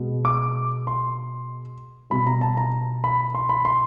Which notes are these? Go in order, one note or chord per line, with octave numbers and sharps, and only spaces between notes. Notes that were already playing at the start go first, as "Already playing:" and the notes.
Already playing: B2 G#3
D6
C6
B2 G3 B5
A#5
A5
A#5
B5
C6
B5
C6